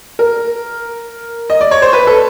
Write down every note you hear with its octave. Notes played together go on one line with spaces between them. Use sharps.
A#4
D#5
D5
C#5
C5
B4
A4